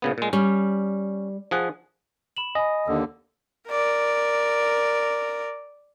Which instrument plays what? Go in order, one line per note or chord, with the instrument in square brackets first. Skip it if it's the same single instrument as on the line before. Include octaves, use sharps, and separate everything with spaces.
[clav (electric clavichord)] A#2 C#3 B3
A#2 G#3
[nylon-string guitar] G3 [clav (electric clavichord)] C#4
[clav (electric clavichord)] F3 G#4 F#5
[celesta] B5 E7 F#7
[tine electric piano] D#5 [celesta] G#5 B5
[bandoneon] D#2 D3 [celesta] E6
[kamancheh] A#4 D5